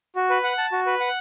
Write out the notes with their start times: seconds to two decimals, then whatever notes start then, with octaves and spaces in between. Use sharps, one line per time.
0.15 F#4
0.30 B4
0.44 F#5
0.58 A5
0.72 F#4
0.86 B4
1.00 F#5